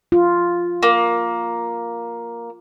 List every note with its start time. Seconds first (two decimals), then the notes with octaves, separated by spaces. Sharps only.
0.12 F4
0.83 A#3